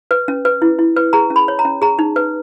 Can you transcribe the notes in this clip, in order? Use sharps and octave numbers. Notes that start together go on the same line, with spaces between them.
B4
C#4
B4
E4
E4
B4
G#4 A#5
C#4
B5
C#5
A#5
C#4
G#4 A#5
D#4
B4